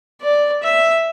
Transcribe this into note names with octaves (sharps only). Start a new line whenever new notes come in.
D5
E5